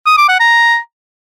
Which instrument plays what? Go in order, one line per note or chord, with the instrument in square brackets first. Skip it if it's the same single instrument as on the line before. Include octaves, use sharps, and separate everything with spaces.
[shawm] D#6
D6
F#5
A#5